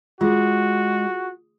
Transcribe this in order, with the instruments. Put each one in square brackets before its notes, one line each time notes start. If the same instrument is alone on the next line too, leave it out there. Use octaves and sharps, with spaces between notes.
[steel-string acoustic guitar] G#3 [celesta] F4 G#4 [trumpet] F#4